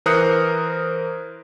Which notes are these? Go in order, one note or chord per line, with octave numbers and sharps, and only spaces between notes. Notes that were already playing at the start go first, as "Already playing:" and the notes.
E3 A#4 C5 D#6 F#6 C#7